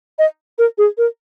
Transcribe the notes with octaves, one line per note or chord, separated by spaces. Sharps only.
D#5
A#4
G#4
A#4